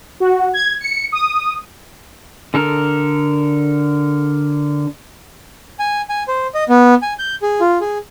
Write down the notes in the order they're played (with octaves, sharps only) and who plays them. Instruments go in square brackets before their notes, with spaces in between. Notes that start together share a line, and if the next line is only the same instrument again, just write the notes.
[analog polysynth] F#4
G#6
C#7
D#6
[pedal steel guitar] D3 A4 A#4
[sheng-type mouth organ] G#5
G#5
C5
D#5
B3
G#5
G6
G#4
F4
G#4